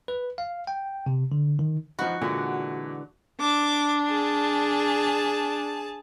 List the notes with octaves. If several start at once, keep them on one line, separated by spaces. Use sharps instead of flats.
B4
F5
G5
C3
D3
D#3
F3 D#4 F#4 B5
A#2 D3 E3 G#3
D4 D6
G#4 A5